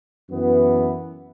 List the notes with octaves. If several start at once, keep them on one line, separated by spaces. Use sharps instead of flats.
F#2 E3 B3